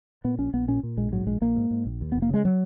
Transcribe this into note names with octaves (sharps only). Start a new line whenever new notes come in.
A#2 B3
A#1 C#4
A#1 B3
A#2 C#4
A#2
A#1 G#3
G#2 F#3
A#1 G#3
A#1 A#3
G#2
G#2
A#1
D#2
B3
F1
A#3
C#3 G#3
F#3